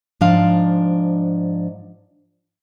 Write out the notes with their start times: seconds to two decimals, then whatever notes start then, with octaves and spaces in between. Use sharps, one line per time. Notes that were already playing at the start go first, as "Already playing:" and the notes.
0.21 G#2 F3 D4 F5